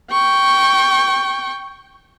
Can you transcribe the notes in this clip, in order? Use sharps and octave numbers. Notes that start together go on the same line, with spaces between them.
G5 C#6